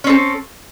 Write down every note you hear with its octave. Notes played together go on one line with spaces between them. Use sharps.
C4 C#4 A4